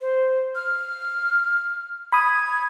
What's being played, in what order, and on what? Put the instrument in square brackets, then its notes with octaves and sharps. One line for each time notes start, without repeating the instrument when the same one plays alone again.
[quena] C5
F6
[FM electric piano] B5 D#6 [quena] G#6